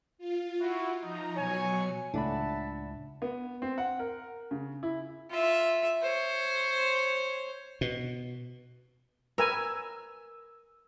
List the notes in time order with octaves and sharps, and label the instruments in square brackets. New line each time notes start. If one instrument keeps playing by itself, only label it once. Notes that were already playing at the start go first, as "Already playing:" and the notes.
[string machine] F4
[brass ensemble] E4 F#4
[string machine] F3 A#5 [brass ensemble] D#4
[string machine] B2 F#3 C#7 [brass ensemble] C#5 G#5
[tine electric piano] C#2 [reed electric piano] A2 D5 B5 [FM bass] D4 [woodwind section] E5 F#5 A5
[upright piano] B3
C4
F#5
A#4
C#3
E4
[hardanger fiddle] F4 E5
C5 C#5
[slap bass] B2
[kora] A#4 [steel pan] B4 G#5 [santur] E6